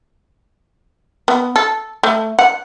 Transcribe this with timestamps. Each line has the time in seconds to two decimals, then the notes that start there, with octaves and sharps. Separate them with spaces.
1.28 B3
1.56 A4
2.03 A3
2.39 F#5